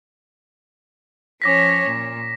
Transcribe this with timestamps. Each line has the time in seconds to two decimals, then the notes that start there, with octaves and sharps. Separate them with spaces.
1.42 F3 C#4 C#5 D6 A#6 B6
1.87 A#2